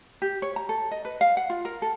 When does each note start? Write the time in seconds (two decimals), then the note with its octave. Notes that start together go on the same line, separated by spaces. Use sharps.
0.22 G4
0.42 C#5
0.56 A#5
0.69 A4
0.91 D#5
1.05 B4
1.21 F5
1.37 F#5
1.50 F4
1.65 A#4
1.82 A4